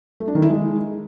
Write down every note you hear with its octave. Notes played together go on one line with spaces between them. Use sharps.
A3
D4
D#3
E4
G#3